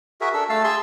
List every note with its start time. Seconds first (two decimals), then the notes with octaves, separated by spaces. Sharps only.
0.21 F#4 G#4 A#4 E5
0.34 D4 A4 E6
0.49 A3 F5 A5 E6
0.64 G#4 A5 C6 E6